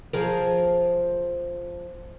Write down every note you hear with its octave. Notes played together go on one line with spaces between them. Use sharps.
F3 G#4 A#4